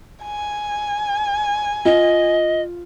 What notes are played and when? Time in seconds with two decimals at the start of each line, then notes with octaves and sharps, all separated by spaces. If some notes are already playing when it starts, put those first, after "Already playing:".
0.24 G#5
1.85 F4 D#5